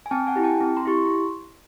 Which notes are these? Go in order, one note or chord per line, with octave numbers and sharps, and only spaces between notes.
G#5
C4 G5 A5
F#5 G#5
E4 G4
G5 A5
C4
A#5 C6
E4 G4 C#6
C6